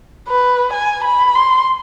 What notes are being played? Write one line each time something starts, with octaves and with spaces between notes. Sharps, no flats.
B4
G#5
B5
C6